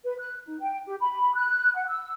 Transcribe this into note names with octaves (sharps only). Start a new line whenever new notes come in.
B4
F#6
D#4
G5
G4
B5
F#6
F#5
E6